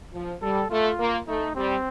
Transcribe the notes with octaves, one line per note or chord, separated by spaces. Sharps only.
F3
G3 A4
A3 F4
A#3
A3 D#4
G3 C4